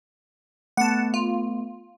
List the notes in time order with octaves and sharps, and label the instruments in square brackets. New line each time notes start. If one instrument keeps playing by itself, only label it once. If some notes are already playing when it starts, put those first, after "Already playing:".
[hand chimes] A3 B3 [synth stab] F#5 A5
[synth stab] F4